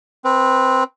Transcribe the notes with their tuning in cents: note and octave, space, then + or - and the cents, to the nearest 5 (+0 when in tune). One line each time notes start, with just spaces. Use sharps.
C4 +0 B4 -20